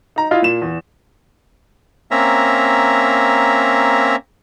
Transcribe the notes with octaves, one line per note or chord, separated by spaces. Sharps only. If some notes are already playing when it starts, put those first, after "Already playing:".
D#4 A#5
E4 F4 D#5 F5
A#2 E7
E2
A#3 C4 C#4 E5 A#5